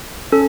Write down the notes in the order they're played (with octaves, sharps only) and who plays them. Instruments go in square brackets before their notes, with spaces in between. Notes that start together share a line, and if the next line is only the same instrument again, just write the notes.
[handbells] C#4 A4